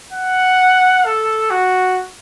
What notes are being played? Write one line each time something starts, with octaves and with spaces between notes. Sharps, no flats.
F#5
A4
F#4